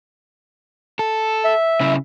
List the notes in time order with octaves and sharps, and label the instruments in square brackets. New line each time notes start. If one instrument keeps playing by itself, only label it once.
[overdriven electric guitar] A4
[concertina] E5
[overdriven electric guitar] C#3 E4